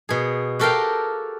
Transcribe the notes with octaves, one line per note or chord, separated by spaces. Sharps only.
B2 G#4
F#4 G4 A4 A#4 F5 G5